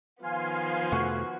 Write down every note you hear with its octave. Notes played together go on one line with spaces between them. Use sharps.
D#3 F3 B3 F5 G#5 C6
F2 C3 A3 F#4